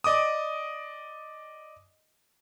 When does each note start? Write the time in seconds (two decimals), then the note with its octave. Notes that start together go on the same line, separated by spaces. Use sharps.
0.04 D5 D#5 D6 D#6